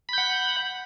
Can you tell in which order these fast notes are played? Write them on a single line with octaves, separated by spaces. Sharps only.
B5 G6 F#5